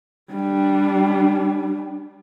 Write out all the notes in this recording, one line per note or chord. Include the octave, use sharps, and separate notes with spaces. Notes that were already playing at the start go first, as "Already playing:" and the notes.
G3 D4